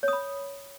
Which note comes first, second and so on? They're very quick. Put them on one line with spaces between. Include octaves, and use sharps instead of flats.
C#5 D#6 B5